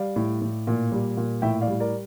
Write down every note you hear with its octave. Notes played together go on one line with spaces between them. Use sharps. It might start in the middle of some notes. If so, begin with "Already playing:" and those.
Already playing: G3 D5 F5
A2
A2
A#2
G3
A#2
A2 E5 G5
D5 F5
G3
A#4 D5